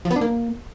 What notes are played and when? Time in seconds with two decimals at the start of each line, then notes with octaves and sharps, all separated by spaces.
0.05 F3
0.11 B3
0.16 D4
0.21 A#3